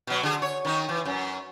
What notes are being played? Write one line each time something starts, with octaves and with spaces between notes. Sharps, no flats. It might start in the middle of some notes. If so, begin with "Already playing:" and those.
B2 F#3
D3 G#4
C#5
D#3 D#4
E3
F#2